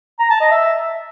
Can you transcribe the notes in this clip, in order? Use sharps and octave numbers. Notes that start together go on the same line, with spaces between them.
A#5
A5
D#5
E5